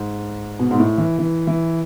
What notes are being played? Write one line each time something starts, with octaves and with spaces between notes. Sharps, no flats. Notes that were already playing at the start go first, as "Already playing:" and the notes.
Already playing: G#2
B2
G#2
A2
E3
E3
E3